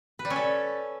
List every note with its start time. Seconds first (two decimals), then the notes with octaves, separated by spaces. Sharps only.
0.19 B4
0.25 G3
0.30 C#4
0.36 A4